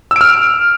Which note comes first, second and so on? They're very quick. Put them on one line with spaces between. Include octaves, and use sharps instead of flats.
E6 D7 F6